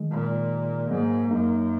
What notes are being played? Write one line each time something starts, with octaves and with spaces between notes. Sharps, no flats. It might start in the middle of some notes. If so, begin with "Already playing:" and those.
Already playing: D#3 G#3
A#2
G#3
G#2 F#3 A#3
F#2 A#3 D#4